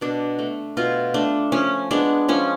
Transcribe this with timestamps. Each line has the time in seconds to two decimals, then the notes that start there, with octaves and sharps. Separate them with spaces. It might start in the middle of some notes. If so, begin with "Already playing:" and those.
0.01 B2 D4
0.39 A3
0.77 B2 F4
1.14 A3 D4
1.52 F3 C#4
1.91 G#3 B3 D4
2.28 F3 C#4